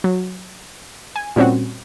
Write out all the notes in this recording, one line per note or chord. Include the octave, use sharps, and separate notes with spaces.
F#3
G#5
A#2 G3 C4 C#4 F#4